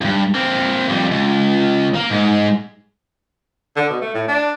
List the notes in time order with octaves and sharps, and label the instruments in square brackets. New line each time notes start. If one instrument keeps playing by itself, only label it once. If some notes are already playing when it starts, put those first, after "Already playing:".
[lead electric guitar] E2 G2
A#3 C4
F2 G3
C#2
A#3
G#2 G#3
[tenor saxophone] D3
B2
A3
A2
D4